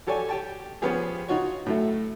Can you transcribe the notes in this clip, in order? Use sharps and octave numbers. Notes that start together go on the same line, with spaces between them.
F#4 G4 A4 C#5 D5 G#5
G4 G5 A5
F3 B3 C#4 F4 G4 G#4
D#4 F4 F#4 C#5
A2 F#3 A3